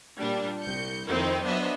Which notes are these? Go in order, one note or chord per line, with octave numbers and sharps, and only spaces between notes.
A#2 G3 D4
C2 G6 C#7
F2 D#3 C4 D#4 E4
F#3 B3 D4 C5 D#5 E5